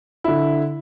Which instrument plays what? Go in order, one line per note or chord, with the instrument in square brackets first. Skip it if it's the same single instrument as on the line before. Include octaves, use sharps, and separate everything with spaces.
[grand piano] D3 E4